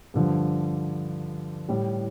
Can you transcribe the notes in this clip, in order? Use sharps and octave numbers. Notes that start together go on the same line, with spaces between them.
G2 D3 F3
A2 G3